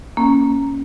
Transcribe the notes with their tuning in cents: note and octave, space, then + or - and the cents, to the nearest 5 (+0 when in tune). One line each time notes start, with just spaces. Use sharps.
A#3 +0 C#4 +0